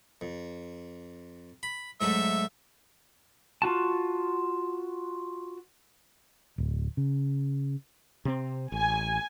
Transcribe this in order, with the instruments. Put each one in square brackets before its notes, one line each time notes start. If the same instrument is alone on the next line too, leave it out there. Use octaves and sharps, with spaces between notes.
[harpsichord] F2
B5
[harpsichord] G#2 F#3 A3 [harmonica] E5
[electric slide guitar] F4 F#4 A5
[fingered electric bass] D1
C#3
[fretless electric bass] C3 C4
[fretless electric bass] A1 [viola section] G#5